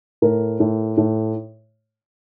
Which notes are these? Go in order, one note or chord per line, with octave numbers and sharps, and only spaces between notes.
A2 A#4
A2
A2